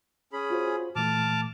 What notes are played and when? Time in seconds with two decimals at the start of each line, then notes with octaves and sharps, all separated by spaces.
0.33 C#4 G#4 B5
0.50 F4 F#4 C5
0.96 A#2 E3 A3 A5 D6 F6